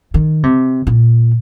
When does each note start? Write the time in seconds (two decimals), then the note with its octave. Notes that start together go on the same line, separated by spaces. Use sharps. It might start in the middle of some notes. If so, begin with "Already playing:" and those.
0.14 D#3
0.43 C3
0.87 A#2